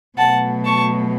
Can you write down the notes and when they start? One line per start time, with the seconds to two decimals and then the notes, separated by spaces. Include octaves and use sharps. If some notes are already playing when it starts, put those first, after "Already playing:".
0.17 B2 F#3 A3 F#5 A5
0.65 A5 C#6